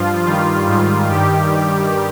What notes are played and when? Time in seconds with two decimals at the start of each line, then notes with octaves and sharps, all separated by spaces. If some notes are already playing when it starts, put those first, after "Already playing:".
Already playing: G2 F3 F4
0.25 G2 D#3 G3 F4
0.67 G#2 D#3 G3
1.09 G2 D#3 G3 G4